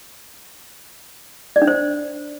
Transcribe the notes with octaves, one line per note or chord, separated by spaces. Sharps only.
D5
D4
C5